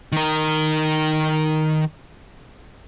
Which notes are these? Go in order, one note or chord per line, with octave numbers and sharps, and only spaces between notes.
D#3 A#4